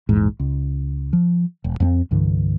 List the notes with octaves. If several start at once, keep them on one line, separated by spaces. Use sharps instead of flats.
A#1 E2 G#2
C#2
F3
E1
F2 G#3 C4
C2 G2 D3 E3